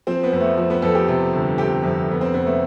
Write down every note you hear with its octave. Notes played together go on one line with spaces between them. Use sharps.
F3 C4
B3
F2
A3
F3
B3
F2 A4
G4
C3
G1
C3 G4
F2
F1 B3
C4
F1 B3
A3